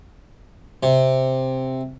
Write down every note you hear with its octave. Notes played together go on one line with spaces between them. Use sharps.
C3